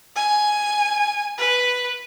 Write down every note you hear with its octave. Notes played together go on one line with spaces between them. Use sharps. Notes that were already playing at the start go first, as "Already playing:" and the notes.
G#5
B4